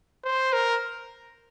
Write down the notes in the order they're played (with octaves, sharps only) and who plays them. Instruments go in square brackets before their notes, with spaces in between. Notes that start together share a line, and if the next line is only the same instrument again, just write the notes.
[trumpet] C5
A#4